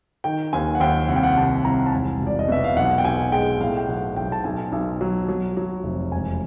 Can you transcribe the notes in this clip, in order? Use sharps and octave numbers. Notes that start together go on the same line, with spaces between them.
D#3 G5
D#2 G#5
F#5
D#2 G5
C2 F#5
G5
F#5
C3 A5
C2 A#5
A5
E1 G#5
E1
D5
D#5
B2 E5
F5
B1 F#5
G5
B1 G#5
G#3 G5
A2 F5
G5
B1 F#5
B1 G5
A5
B1 G#5
B1
F#3
F#3
F#3
F1
E1 G#5